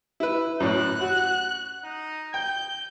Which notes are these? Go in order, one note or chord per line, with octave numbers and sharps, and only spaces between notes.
E4 B4
F#2 A2 F#6
F#4
D#4
G5 G6